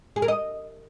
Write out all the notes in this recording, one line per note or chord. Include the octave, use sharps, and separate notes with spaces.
G#4
A#4
D#5